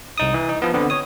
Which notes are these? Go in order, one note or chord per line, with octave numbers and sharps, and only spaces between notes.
C2 D#4 D#6
E3
D#4
F3 B3
D3 B3 C4
C#5 D#6